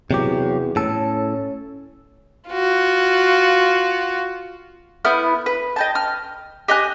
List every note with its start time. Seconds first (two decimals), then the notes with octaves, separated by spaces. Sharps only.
0.11 E2 C3 F#3 G4
0.76 A2 C#4 A4
2.50 F4 F#4
5.05 B3 E4 F6 G6
5.46 B4
5.76 D#5 G5 A5
5.95 F6
6.68 G4 D#5 G#5 F#6